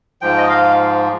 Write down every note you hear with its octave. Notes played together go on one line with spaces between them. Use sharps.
G#2 F3 G5
D#5
F5